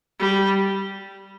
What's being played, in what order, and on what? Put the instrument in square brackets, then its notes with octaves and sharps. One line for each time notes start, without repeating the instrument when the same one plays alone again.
[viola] G3